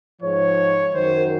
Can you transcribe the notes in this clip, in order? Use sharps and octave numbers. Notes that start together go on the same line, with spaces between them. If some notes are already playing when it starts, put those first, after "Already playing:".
G#2 F3 C#5
F#2 D#3 F#3 C5